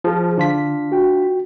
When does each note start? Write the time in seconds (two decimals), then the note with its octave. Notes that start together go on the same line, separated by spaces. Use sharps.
0.04 F3 F4 G#4 A5
0.38 D3 D4 F4 B6
0.92 F#4 G5